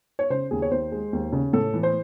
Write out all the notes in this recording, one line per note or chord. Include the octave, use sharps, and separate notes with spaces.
C#5
C#3 C5
D#2 G#4
C#5
D#2 C5
G#3
D#2
C#3
A2 A4
E3
C5